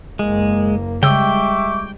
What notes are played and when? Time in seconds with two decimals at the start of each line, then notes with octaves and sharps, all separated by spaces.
0.19 F#1 G#3 A#3
1.03 C#3 G3 G#3 E5 G5 C#6 D6 E6